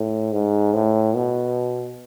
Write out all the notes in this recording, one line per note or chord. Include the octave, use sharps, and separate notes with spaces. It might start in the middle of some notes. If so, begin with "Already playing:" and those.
Already playing: A2
G#2
A2
B2